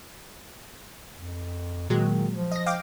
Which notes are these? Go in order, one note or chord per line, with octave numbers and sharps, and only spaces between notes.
F2
A#2 D#3 F#3 G#3
F3
D#5 A#6
F5 G5 D6